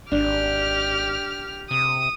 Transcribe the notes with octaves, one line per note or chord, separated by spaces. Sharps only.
G#1 D4 G4 F6
C3 D#6